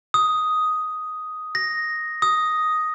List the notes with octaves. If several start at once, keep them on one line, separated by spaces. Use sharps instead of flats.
D#6
A#6
D#6